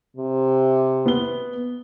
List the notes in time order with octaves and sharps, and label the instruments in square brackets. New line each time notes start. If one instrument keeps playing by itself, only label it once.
[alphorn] C3
[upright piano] B3 G7